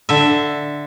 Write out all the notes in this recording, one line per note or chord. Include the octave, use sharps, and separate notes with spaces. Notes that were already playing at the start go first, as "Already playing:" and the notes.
D3 E5